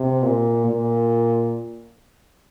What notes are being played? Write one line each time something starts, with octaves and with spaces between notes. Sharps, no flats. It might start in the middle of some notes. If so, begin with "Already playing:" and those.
Already playing: C3
A#2
A#2